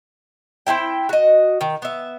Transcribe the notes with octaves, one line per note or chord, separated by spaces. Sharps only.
C4 D#4 E4 G5
F#4 D#5
D#3
B3 E5